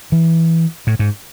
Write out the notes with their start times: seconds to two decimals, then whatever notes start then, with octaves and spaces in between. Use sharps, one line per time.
0.12 E3
0.87 A2
0.99 G#2